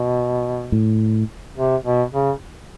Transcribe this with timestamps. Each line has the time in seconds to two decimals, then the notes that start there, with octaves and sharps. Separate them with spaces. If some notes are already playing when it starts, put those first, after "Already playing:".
Already playing: B2
0.72 A2
1.57 C3
1.84 B2
2.12 C#3